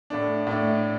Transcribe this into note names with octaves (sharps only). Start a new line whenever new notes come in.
A2 A3 D4
A2 A3 D4